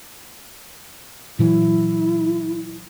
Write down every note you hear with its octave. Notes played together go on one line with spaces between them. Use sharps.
A#2 E3 F#3 E4